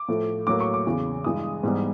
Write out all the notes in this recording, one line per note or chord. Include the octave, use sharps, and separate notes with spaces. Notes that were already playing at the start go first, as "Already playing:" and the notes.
Already playing: D6
A2 F3 A3
A2 F#3 A#3 D6
C#6
D6
E2 C#3 E3
G2 E3 G#3 D#6
G#2 E3 G3 B3